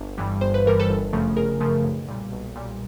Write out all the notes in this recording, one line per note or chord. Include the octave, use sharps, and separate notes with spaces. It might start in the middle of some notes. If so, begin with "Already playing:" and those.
Already playing: G1
G2 E3 G3
G1 C5
B4
G2 E3 G3 A#4
A4 B4
G1
F#2 C#3 F3 A3
G1 G#4 A#4
F#2 C#3 F3 A3
B1
A#2 G3
B1
A#2 G3